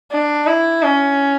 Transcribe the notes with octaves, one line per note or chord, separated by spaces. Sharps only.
D4
E4
C#4